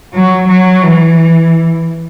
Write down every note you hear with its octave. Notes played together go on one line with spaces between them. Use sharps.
F#3
F#3
E3